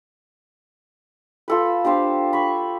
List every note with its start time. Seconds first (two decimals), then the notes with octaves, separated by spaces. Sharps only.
1.48 F4 A4 B4
1.84 D4 G4 C5 F5
2.33 B5 C#6